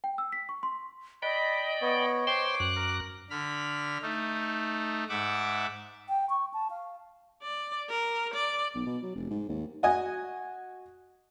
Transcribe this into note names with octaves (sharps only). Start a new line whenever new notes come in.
G5
E6
B6
C#6
C6
D5 D#5 G5 B5
B3 C#5
C5 G5 C6 D6
F#2 F#6 F#7
A#4
D3 B5 F6
A3 D#4
G#2 E5 F#5 D6
G5
C#6
A5
F5
D5
A#4
D5
B1
B2
F#3
F1
G#2
D#2
F#4 D#5 G#5